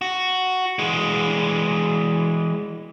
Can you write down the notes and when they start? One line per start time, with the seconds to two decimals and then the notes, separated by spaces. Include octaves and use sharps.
0.01 F#4
0.79 E3 G#3